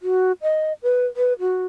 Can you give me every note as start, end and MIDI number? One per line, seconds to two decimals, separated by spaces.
0.02 0.32 66
0.42 0.73 75
0.83 1.06 71
1.17 1.33 71
1.40 1.66 66